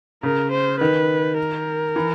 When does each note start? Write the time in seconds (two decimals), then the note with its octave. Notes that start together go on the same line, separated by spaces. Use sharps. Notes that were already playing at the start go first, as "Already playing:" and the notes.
0.23 C#3 A#4
0.52 C5
0.80 D#3 B4
1.38 A#4
1.96 E3